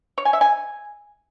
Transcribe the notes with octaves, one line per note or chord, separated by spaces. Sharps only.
C#5
G#5
E5
G#5